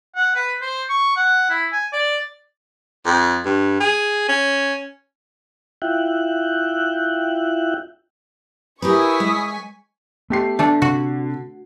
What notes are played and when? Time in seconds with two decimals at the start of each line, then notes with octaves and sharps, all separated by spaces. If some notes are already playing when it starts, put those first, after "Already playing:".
0.15 F#5
0.35 B4
0.62 C5
0.90 C#6
1.16 F#5
1.50 E4
1.73 G#5
1.92 D5
3.06 F2
3.45 G2
3.80 G#4
4.29 C#4
5.82 E4 F4 E5 G5 F#6
8.82 E4 G4 A#4 B4 G#5 C#6 D#6 B6
9.20 G#3
10.30 A3 B3 G4 C7
10.59 D3 A3 D4 A4
10.82 C3 F#4